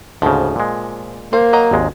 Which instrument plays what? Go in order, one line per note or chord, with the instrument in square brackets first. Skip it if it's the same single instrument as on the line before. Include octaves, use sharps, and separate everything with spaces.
[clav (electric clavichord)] D2 G#2 C#3 [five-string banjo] F3
[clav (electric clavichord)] A#2 G#3
[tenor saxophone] A#3 [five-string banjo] C5
[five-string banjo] F#3 D#5 A#5
[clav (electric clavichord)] G#1 D#2 G#3